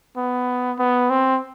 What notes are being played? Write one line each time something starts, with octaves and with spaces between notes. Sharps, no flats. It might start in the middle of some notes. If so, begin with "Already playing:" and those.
B3
B3
C4